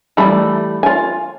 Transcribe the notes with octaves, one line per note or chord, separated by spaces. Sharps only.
E3 G3 A3 B5
F4 G#5